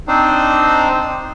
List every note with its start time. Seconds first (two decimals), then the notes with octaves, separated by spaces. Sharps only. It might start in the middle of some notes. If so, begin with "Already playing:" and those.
0.08 C4 D4 D#4 C5